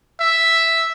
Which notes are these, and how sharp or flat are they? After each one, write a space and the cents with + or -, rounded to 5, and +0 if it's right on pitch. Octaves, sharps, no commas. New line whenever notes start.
E5 +0